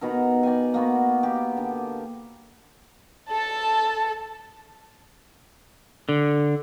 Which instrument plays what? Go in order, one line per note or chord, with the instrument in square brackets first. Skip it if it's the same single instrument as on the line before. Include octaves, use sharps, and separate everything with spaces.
[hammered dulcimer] B2 D#4 A#4
D5 G5 G#5
A#3 B3 F#4
G4
D3
[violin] A4 A5
[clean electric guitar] D3